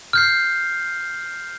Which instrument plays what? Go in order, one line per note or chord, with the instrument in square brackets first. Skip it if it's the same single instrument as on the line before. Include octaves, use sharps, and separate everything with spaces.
[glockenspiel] F6 G6 C7